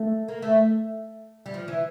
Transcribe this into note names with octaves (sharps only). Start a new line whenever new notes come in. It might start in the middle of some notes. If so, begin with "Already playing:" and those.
Already playing: A3
A#3
A3
G3
F3
E3